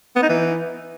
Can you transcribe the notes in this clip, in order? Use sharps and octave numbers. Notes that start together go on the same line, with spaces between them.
B3
D#4
E3